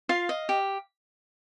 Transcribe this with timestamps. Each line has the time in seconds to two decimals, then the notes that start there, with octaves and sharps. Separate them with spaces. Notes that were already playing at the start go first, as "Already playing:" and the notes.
0.09 F4 F5
0.29 D#5
0.49 G4